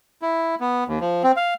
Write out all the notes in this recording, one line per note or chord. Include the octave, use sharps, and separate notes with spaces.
E4
B3
D#2
F3
C4
F5